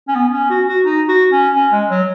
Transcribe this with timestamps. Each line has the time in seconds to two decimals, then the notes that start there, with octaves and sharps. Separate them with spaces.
0.08 C#4
0.15 B3
0.33 C#4
0.50 F#4
0.68 F#4
0.85 D#4
1.08 F#4
1.32 C#4
1.55 C#4
1.72 G#3
1.90 F#3